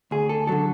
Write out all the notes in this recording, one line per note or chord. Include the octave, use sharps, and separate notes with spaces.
D2 G#4
A4
D3 F#3 A4